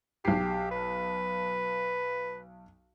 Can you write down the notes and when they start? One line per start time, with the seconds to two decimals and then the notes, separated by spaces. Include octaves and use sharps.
0.25 B1 G4 C7
0.71 B4